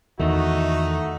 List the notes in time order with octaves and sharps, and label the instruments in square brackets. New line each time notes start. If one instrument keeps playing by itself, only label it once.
[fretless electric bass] E2 D#3 [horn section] A3 D#4 [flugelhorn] F#4